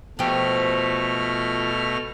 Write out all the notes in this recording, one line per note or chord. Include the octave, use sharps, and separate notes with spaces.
B2 F3 A3 G4 F6